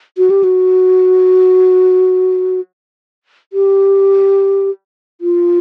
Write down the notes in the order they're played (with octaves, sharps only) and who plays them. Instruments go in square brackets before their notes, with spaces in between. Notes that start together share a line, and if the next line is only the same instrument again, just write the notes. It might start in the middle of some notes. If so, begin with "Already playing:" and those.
[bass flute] F#4
G4
F#4
G4
F4